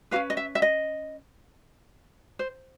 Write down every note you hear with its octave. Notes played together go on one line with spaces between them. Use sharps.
C#4 F#4 B4 F5
D#5
E5
E5
D#5
C5